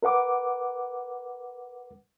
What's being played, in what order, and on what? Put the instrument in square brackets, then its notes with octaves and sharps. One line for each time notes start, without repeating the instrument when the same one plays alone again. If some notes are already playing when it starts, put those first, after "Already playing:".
[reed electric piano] A#4 B4 F#5 D6